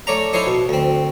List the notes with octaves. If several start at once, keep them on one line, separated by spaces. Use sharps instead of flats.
A3 C#5 D5 A#5
D#4 E4 A4 C5 C#5 D#5
B2
D2 C4